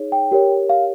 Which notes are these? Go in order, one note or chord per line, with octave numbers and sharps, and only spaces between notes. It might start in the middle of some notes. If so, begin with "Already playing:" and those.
Already playing: D#4 G#4 C#5
G5
G4 A#4 C#5
F5